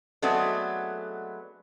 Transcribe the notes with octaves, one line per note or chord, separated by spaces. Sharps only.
F#3 G#3 A3 B3 C4 D4